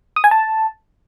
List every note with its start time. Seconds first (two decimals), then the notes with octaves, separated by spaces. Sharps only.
0.16 D#6
0.24 G#5
0.31 A5